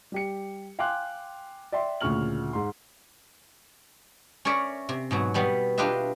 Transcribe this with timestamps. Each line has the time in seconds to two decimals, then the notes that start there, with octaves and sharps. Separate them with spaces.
0.12 G3 G4 C#7
0.79 F5 G5 G#5 C6 D6 F#6
1.72 D5 E5 G5 C6
2.01 D2 A#2 C#3 C#6 F6 F#7
2.53 G#2 C6
4.45 C#4 A#4 C#5 D5 E5
4.89 C3
5.11 G#2 B2 F#3
5.34 B2 G3 B3
5.78 D4 F4 G4 B4 D#5 E5